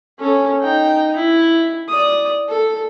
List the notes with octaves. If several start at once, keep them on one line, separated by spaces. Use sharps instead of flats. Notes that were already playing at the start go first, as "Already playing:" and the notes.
C#4 A4
D#4 G5
E4
D5 D#6
A4